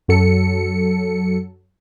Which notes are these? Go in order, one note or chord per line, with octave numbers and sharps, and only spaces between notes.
F#2 F#3 A4 C#7